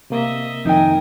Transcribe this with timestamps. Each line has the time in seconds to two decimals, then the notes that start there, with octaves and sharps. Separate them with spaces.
0.10 C3 A#3 D#5 E5
0.65 F2 D#3 D#4 A#4 G5 G#5